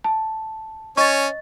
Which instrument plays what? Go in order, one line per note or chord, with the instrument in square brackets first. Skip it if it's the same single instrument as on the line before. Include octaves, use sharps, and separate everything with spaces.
[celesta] A5
[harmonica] C#4 C#5 [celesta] D#5 A6 [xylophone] C#6